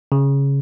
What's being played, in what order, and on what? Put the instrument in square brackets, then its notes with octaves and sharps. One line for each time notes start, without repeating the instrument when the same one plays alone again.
[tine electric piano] C#3